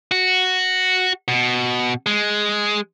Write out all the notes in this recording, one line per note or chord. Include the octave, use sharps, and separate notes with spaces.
F#4
B2
G#3